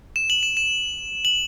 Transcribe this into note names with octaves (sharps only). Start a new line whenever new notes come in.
E7
F#7
E7
E7
F#7